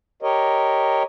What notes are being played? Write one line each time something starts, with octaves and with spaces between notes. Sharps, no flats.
G4 A#4 C#5 D#5